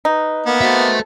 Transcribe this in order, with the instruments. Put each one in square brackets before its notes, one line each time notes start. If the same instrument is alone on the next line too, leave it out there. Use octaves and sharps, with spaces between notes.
[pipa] D#4 [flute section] B4
[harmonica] A#3 B3
[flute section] F#4 B4 C5 [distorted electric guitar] A4 E5